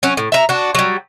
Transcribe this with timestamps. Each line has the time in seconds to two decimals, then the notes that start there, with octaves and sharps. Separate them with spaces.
0.03 F#3 C#4
0.17 A2
0.32 E5 A#5
0.49 D4 F#4
0.75 F#3 G3